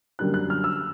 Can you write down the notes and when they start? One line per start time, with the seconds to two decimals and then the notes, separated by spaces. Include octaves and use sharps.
0.19 F#2 D3 G3 A#3 D4 F#6
0.34 F#6
0.50 F6
0.64 E6